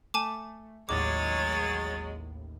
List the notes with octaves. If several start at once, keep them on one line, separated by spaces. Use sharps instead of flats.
A3 G#5 A5 D6
A1 D#2 A2 F#3 G#3 C#5 D6 A6